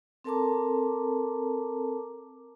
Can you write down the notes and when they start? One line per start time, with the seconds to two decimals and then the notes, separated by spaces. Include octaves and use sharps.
0.24 C4 A4 A#4 A5 A#5 D6